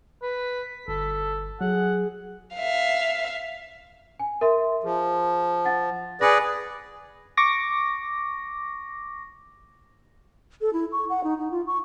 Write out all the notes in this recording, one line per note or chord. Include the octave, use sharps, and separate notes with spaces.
B4 B6
G1 A4
F#3 G#4 F#5
E5 F5
G#5
A#4 E5 C6
F3 G#4
F#5 A6
G#4 B4 D5 A#6 C#7
C#6 D6 A#6
A4
E4
C#6
F#5
D#4
D#4
F4
C#6